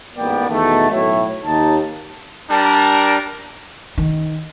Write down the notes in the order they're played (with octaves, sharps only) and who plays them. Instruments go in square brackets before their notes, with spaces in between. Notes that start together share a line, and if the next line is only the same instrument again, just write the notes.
[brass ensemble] A1 G#2 A#3 B3 D5 G5
E2 B2 D#3 A3
B1 A2 A3 C#5 E5
D#2 D#4 A5
[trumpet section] G3 D4 A#4 [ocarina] A5
[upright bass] D#3